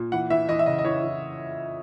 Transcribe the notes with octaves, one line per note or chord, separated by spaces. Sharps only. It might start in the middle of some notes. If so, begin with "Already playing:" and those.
Already playing: A#2
E3 F#5
E3 E5
E3 D#5
E5
C#3 D#5
D#5
E3 C#5
E3